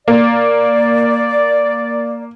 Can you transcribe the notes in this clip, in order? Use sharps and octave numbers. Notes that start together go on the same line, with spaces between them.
A#3 D5